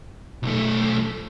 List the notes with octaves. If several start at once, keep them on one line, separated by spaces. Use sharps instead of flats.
B1 A3